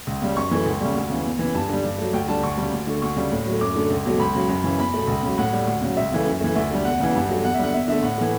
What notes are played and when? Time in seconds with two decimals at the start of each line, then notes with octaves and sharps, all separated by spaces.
0.07 C#2
0.22 C#3 G3
0.37 F#2 C#6
0.51 E3 A3
0.66 C#2
0.81 C#3 G3
0.95 D2
1.10 C#3 E3
1.25 E2
1.39 C#3 E3
1.54 G2 A5
1.69 D3 G3
1.84 G2
1.98 F#3 A3
2.13 D2 G5
2.28 D3 G3 A5
2.43 D2 C#6
2.57 C#3 G3
2.72 D2
2.87 D3 A3
3.02 D2 C#6
3.16 C#3 G3
3.32 A2
3.46 F#3 A3
3.61 F#2 D6
3.76 D3 A3
3.90 C#2
4.05 B2 F#3 A3
4.20 C#2 B5
4.35 C#3 F#3
4.49 F#2
4.64 C#3 E3
4.78 E2 B5
4.94 B2 A3
5.08 C#2
5.23 C#3 F#3
5.38 A2 F#5
5.53 G3
5.67 D2
5.82 C#3 F#3
5.97 C#2 E5
6.12 C#3 E3 A3
6.26 F#2
6.41 E3 A3
6.55 D2 E5
6.71 D3 G3
6.85 E2 F#5
7.00 C#3 E3
7.15 G2
7.29 F#3 A3
7.44 E2 F#5
7.54 E5
7.59 D3 G3 F#5
7.74 E2 E5
7.88 D3 A3 E5
8.03 A2 F#5
8.18 E3 A3